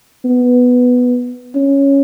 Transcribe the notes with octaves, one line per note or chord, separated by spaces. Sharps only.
B3
C#4